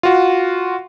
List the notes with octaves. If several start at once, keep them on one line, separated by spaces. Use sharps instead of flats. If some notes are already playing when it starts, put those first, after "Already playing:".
F4 F#4